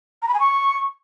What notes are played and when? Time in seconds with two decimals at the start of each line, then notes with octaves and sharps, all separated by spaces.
0.22 A#5
0.28 B5
0.34 G#5
0.40 C#6